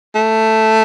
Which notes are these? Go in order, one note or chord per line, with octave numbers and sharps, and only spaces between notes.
A3